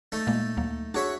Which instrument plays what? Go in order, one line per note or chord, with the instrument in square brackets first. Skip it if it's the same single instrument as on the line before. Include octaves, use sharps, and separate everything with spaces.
[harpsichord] A3 D#4 A4
[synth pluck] A#2 G#3 A#3
D2 F#3 A#3
[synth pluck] D4 G#4 [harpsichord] F#4 C#5 E5